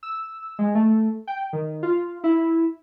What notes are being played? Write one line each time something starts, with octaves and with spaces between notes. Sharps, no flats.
E6
G#3
A3
G5
D#3
F4
E4